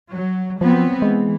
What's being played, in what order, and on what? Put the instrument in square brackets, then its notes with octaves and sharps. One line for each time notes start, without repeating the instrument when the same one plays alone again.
[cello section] F#3
[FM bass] F3 [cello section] F#3 B3 C4
[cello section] E3 [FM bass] G#3